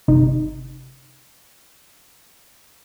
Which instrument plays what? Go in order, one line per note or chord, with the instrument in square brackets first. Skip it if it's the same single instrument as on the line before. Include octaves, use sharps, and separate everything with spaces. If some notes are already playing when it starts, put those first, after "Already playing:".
[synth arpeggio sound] G1 C3 D#4